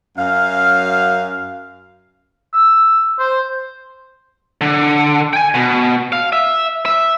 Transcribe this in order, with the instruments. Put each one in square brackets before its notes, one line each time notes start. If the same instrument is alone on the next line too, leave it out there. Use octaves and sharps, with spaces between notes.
[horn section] F#2 F5
[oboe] E6
C5
[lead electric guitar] D3
G5 G#5
B2
F5
E5
E5